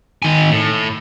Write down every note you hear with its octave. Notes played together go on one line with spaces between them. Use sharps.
D#3 G#5
A2